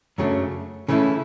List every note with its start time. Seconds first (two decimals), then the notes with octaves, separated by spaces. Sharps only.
0.18 F#2 C#3 F#3 A3 D4
0.88 C#3 E3 A3 C#4 E4